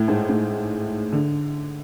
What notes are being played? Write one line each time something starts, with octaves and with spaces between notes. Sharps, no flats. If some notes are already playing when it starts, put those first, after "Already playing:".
Already playing: A2
G#2
A2
D3